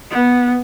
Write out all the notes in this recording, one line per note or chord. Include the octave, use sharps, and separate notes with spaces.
B3